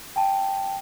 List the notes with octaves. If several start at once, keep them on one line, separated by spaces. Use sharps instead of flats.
G5 A5